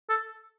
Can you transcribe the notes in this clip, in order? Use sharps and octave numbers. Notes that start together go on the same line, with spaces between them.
A4